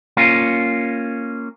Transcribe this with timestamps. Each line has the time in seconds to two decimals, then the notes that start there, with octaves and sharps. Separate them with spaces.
0.17 A#3 C#4 F4